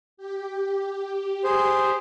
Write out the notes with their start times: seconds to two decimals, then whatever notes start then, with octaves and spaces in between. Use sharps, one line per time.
0.17 G4
1.44 G#4 C5